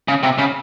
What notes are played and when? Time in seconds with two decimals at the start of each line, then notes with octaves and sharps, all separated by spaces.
0.08 C#3
0.23 C3
0.38 C#3